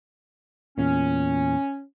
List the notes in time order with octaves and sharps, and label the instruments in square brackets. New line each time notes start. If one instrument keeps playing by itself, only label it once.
[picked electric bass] E2 A#2 [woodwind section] C#4